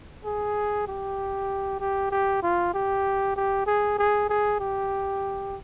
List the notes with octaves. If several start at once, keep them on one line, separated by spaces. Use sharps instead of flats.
G#4
G4
G4
G4
F4
G4
G4
G#4
G#4
G#4
G4